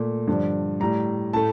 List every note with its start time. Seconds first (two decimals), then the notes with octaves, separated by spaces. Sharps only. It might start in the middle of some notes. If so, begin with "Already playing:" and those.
Already playing: A#2 A3
0.27 G2 D3 F3
0.80 A2 G3 A#5
1.33 A2 A3 A5